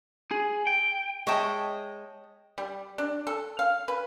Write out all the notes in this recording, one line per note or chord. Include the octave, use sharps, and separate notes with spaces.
G#4
G5
G#3 C#5 D#5 E5 G5 A5
G3
D4
A4
F5
B4